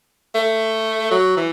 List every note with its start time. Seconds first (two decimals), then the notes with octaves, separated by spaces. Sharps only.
0.35 A3
1.11 F#3
1.37 E3